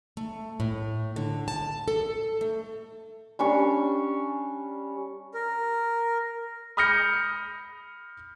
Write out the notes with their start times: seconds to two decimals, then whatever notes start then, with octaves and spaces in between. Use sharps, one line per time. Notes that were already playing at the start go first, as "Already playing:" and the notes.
0.17 A3
0.60 A2
1.16 D3
1.48 A5
1.88 A4
2.41 A3
3.39 G3 C#4 D4 C#6
5.34 A#4
6.77 B5 D#6 F6 G6 A#6 C#7